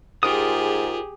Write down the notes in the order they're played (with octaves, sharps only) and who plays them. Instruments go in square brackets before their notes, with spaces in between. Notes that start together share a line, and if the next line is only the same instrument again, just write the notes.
[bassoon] G#2 [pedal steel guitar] F4 A#4 D#6 [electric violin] G4 G#4